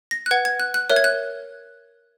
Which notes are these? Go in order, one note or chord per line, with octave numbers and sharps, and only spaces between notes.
A#6
F#6
B4 F#5 G#6
G#6
F#6
F#6
A#4 C#5 E5 F#6
G#6
F#6